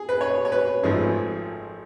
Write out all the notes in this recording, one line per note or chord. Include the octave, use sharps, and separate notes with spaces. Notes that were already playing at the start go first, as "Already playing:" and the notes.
Already playing: G#4
B4
C#5
C#5
B4
G#1 G#2 F3 A3 G#4